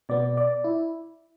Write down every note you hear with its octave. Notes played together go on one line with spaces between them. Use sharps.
B2 B3 D5
D5
E4